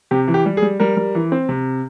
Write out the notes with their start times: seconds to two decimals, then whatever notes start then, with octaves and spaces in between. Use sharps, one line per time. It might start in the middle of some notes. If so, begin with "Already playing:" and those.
0.11 C3 G4
0.28 E3
0.34 G4
0.46 G3
0.57 G#4
0.62 G3
0.80 G3 A#4
0.97 G3
1.15 E3
1.32 C4
1.49 C3